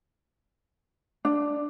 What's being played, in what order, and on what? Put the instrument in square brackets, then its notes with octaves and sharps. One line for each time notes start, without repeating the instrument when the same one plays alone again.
[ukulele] D4